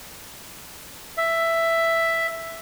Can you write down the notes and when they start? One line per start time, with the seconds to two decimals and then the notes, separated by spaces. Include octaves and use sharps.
1.17 E5